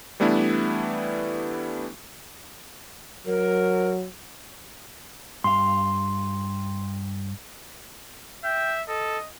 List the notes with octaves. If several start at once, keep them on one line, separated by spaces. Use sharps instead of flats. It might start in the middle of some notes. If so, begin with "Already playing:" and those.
E3 G3 A3 B3 D4 E4
F#3 A#4
G2 F5 C6
E5 G5
A4 D#5